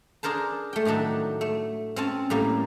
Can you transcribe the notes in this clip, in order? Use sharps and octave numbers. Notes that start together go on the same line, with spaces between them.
D4 G#4 A#4 C5 A5
A3 G5
A2 D#3 F#3 D4 A4
A3
C4 C#4 A5
A2 G3 A#3